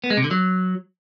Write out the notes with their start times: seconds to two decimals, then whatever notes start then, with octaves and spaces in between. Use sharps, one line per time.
0.04 B3
0.10 G#3
0.17 C3
0.24 D3
0.31 F#3